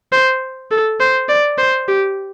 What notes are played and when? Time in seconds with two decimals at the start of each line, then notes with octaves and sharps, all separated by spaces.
0.12 C5
0.71 A4
1.00 C5
1.29 D5
1.58 C5
1.88 G4